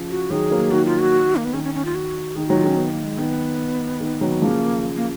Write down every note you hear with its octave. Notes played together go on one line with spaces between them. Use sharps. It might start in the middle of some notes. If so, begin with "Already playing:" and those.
Already playing: C#3 F3
F#4
D#3 F#3 G#4
F#3 A#3
D#3 F#4
F4
F#4
A#3
B3
D#3 C#4
C#4
C#4
F4
F#4
D#3 G#4
D#3 F#3 F#4
F4
D#3 C#4
B3
A#3
G#3
D#3 B3
D#3
D#3 F#3
C#3 F3 A#3
A#3